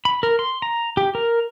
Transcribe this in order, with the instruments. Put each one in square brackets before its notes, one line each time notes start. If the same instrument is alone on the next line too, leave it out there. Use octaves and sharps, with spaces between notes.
[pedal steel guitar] B5
A#4
C6
A#5
G4
A#4